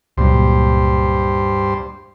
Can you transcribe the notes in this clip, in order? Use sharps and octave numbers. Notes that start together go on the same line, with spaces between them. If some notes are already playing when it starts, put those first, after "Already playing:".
C#2 G2 A#2 F#3 C5